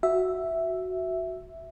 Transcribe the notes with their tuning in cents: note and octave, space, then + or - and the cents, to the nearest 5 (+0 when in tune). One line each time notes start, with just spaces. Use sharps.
F#4 +0 E5 +0